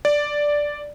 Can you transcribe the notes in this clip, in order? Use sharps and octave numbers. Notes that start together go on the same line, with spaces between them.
D5